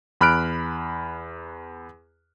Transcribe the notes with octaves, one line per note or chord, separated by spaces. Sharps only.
E2 B5 F6 F#6 D7